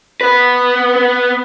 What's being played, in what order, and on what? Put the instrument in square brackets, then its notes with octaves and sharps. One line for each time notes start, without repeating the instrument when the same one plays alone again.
[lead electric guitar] B3 B4